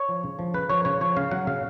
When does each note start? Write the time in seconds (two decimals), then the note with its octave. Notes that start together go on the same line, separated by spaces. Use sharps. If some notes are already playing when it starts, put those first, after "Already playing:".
Already playing: C#5
0.09 F3
0.24 C#3
0.39 F3
0.54 C#3 B4
0.70 F3 C#5
0.85 C#3 C#5
1.01 F3 C#5
1.16 C#3 F5
1.31 F#3 F#5
1.47 C#3 F5